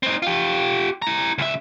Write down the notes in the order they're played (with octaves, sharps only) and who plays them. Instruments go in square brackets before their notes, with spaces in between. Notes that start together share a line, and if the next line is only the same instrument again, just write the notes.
[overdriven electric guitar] C4 D#4
F4 G4
E4 A#5
C#2 E5